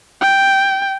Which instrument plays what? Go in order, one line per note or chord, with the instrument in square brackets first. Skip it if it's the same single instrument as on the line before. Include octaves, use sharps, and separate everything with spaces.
[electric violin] G5